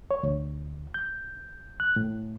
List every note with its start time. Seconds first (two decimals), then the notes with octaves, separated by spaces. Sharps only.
0.11 C#5
0.23 D2
0.94 G6
1.80 F#6
1.96 A2